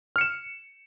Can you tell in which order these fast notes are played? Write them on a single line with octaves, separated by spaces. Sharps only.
F6 C#7 E7